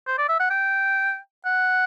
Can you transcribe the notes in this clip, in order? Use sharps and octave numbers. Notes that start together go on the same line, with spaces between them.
C5
D5
E5
F#5
G5
F#5